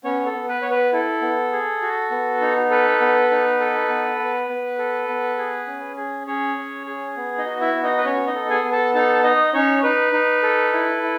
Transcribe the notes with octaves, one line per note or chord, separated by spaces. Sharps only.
B3 C#4 C#5
A4
B3
B4
B3 C#5
B4
E4 A4
B3
G#4
F#4
B3
D#4
A4 B4
B3
D#4
A4
B3
B3
B3
A4
B3
G#4
C#4
G#4
C#4 G#4 C#5
C#4
G#4
B3
D#4 D#5
F#4
E4 E5
B3
D#4 D#5
B4
B3 C#4 C#5
D#4 D#5
A4
G#4 G#5
B3
A4 A5
D#4 A4 A5
D#4 D#5
C#4 D#4 C#5
D#4 B4
D#4
A4
E4
E4